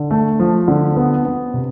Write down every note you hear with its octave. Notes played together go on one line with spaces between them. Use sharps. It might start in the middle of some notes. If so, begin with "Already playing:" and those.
Already playing: D3
A3
F3
D3
B3
B3
C3